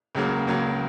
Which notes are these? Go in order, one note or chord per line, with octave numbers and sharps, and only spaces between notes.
C#2 C#3 F#3 A#3
C#2 C#3 F#3 A#3